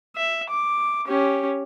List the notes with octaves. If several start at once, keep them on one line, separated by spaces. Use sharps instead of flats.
E5
D6
C#4 G4